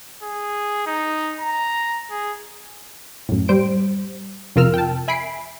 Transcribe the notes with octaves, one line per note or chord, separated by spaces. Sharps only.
G#4
D#4
A#5
G#4
F#2 A2
G3 C5 D7
F2 C3 F4 A#4 E6 F6
G5 A5
E5 G#5 B5 B6 C7 D7